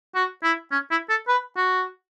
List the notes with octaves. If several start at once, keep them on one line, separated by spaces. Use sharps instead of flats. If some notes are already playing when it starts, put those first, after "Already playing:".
F#4
E4
C#4
E4
A4
B4
F#4